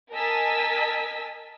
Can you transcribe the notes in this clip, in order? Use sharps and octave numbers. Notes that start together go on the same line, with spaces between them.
A#4 D#5 G#5 A5 E6 B6